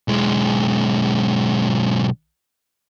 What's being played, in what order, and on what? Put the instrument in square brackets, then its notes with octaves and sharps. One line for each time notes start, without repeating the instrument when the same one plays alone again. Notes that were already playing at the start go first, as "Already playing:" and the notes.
[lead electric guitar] B1 G#3